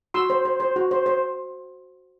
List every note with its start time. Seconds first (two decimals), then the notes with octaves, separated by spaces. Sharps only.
0.14 F#4 C6 E6
0.30 C5
0.45 C5
0.60 C5
0.76 F#4
0.91 C5
1.06 C5